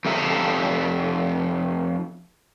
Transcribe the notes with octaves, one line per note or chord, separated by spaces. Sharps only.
F2 A3 G4 E5 A#5